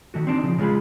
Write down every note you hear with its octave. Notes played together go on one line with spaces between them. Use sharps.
D#3 A3 F#4
C4 D4 D#4
C#3 F3
C#3 G#3 F4 G#4 B5